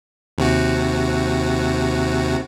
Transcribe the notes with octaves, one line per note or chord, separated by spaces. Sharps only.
D#2 C3 F#4